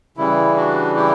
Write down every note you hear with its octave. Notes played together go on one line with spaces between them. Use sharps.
C#3 E3 G3 E4
D4 F#4
E4 G4